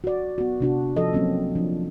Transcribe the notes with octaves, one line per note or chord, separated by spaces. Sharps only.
F#4 D5
B3 F#4
C3 D4 F#4
F3 A4 D#5
F#3 A#3 C4 C#4
F3 D4